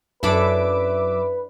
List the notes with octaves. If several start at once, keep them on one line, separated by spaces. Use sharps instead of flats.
F#2 D4 E4 A4 B4 E5 D6